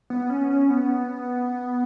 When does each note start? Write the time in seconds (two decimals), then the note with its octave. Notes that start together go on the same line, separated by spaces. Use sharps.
0.10 B3
0.30 C#4
0.50 C#4
0.70 B3